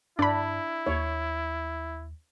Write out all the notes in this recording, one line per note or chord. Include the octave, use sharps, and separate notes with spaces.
G2 D4 E4 D5 B5
D#2 C#5